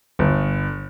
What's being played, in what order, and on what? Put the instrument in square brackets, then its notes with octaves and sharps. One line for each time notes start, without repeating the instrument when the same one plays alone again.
[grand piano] G1